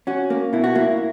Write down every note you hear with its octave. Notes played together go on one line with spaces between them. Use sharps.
C#4 F#4
A#3
B2 E4
F#4
A#3 E4